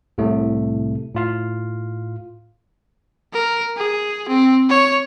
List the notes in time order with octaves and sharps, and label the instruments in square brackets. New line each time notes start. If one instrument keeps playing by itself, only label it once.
[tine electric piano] C2 A2 C3 A3
A2 F4 F5
[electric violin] A#4
G#4
C4
C#5